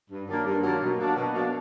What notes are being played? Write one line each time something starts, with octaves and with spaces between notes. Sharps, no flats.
G2
D#3 F#3 A#3 D4
G2
D#3 F#3 A#3 D4
B2
F#3 A#3 D4
B2
F#3 A#3 D4